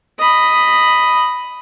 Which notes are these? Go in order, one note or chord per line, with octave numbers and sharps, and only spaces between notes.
D#5 B5